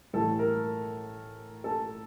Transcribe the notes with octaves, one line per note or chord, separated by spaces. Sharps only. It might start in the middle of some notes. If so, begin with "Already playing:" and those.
A2 E3 G3 A4
A#4
A4